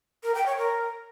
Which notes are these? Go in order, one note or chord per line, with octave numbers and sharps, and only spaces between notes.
A#4
G5
C#5
A#4